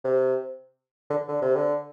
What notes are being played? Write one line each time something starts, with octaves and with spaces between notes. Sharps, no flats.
C3
D3
D3
C3
D3